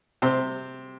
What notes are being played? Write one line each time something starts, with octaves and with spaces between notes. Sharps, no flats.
C3 C5